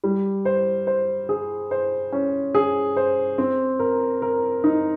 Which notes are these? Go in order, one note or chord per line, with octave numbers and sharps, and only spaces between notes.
G3
C5
C5
G#4
C5
C#4
G#4
C5
C4
A#4
A#4
D#4